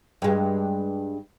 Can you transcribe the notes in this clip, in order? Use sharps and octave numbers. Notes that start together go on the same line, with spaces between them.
G2 G#3